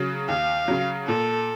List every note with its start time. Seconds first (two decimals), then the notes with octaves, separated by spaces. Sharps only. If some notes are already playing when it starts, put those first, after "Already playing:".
Already playing: C#3 F#3
0.28 D#2 F5
0.68 C#3 F#3
1.07 A#2 A4